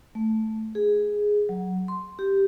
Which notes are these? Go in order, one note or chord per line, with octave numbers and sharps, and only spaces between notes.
A3
G#4
F#3
C6
G4